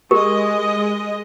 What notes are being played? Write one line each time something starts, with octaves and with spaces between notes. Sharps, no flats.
G#3 G4 A#4 D#5